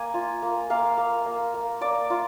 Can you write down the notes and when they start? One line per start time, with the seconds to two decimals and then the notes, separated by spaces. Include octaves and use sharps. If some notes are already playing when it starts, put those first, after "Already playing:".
Already playing: A#3 G#5
0.14 F4
0.42 A#3
0.70 A#3 F5
0.98 A#3
1.26 A#3
1.54 A#3
1.81 A#3 D5
2.10 F4